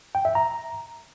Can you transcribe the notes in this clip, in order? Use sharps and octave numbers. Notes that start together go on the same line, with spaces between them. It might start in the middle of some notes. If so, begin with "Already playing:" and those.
G5
E5
A#5